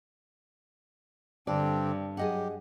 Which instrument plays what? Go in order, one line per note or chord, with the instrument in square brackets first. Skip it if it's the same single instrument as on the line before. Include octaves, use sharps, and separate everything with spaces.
[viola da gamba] G2 [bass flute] D3 [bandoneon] C4 D4 [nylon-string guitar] D5
[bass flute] F#3 [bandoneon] G4 [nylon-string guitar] G#4 D#5 F#5